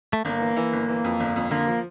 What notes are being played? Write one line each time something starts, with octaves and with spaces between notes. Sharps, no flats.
A3
G1 A#3
E3
E3
G1
E3
F2
G1
F2
D3 A#3
F3